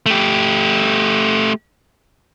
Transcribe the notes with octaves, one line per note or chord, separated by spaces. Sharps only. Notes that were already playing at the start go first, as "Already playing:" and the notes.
A3 G4